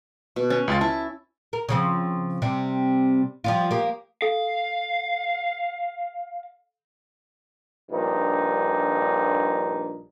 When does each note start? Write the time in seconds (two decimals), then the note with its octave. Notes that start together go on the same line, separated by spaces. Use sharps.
0.36 B2
0.50 C#4
0.68 C#2 F4 A6
0.81 E4 A5
1.53 A#4
1.69 C#3 F3 C4
2.42 C3 G3
3.44 F3 G3 F4
3.71 A#3 G4
4.22 A4 F5
7.91 A#1 G2 D#4